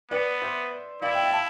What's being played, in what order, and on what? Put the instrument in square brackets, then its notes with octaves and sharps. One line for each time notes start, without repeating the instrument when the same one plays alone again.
[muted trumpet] B3 [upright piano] B4 D5
[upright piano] C5 E5
[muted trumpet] E4 [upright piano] D5 F5
[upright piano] E5 G5
E5 G5
F5 A5